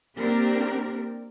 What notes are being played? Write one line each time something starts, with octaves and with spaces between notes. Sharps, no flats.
A#3 C4 D4 G4 A#4